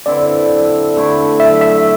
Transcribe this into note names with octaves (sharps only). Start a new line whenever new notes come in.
D3 C4 E4 D5
D3 A3 E4
E5
E5